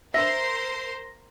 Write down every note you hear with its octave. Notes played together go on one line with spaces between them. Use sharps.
A#4 C5 E5 C6 A#6